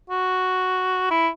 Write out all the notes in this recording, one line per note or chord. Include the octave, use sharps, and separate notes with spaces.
F#4
E4